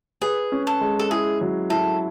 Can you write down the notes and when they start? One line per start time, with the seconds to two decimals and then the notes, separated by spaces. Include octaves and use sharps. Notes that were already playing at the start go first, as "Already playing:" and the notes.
0.22 G#4 B4
0.52 C#4
0.67 A4
0.81 G#3
0.99 A4
1.10 E4 G#4
1.41 F#3
1.70 E4 A4